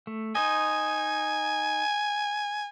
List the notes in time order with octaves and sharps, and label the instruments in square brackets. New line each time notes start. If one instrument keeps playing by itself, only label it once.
[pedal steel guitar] A3
[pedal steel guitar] D#4 C5 D#5 [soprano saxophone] G#5